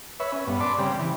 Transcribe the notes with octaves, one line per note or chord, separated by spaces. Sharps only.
B4 C#5 E5
C#4
G2 B3
D5 A5 B5 C6 D6
C#3 G3 C4
E3